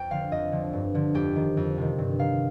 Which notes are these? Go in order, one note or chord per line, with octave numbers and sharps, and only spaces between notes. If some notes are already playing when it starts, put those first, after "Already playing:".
Already playing: F2 G5
D3 F3 F5
F2 D#5
D3 F3
G2
D3 F3
F2 G4
D#3
F2
C3 D#3
G2
D#3 F5